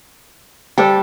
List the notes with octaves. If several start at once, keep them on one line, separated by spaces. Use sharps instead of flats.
G3 G4 A4 C5 G5